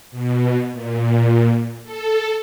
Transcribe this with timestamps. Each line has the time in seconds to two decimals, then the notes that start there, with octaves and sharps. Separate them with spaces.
0.11 B2
0.71 A#2
1.84 A4